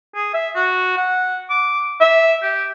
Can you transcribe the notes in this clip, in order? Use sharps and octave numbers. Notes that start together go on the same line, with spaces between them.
G#4
E5
F#4
F#5
D6
E5
G4